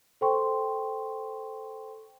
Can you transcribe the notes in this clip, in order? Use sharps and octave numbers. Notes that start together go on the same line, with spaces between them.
A4 C5 G5 C6 C#6